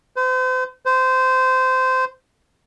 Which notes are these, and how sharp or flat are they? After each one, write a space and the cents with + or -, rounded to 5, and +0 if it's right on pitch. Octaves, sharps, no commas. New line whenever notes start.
C5 -40
C5 -20